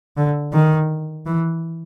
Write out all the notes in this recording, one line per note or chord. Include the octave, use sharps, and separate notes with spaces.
D3
D#3
E3